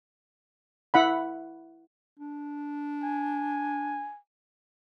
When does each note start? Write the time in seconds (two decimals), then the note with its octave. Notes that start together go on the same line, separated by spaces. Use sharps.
0.94 E4 F#5 B5
2.20 D4
3.04 G#5